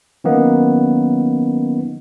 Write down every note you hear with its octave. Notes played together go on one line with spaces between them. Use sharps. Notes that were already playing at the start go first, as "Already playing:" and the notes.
D#3 F#3 A#3 B3 C#4 D#4